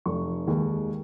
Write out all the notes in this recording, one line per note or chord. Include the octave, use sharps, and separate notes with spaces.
F1 C#6
D#2 D#3 G#3